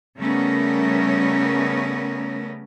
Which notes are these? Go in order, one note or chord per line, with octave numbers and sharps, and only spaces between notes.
C#3 G3 A3 B3 C#4 A#4